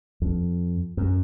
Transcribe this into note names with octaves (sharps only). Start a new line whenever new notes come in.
F2
F#2